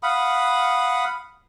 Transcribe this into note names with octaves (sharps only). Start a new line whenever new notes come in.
F5 F#5 B5 D#6